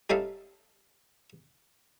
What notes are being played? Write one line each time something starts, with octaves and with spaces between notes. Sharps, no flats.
G3 C#4 D#4 A4 E5 F5